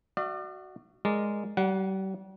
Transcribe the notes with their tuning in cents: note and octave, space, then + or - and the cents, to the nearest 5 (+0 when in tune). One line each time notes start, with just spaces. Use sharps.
F#4 +10 D5 +40 F5 -45
G#3 -5 A#4 +0 D5 +0
G3 -40 F#5 +5